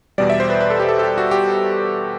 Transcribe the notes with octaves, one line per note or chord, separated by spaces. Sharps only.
E2 B2 G3 D5
E5
C5
B4
B4
A4
G4
A4
A4
G4
F#4
G4